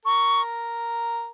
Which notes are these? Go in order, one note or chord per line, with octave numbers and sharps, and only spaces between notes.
A#4 C#6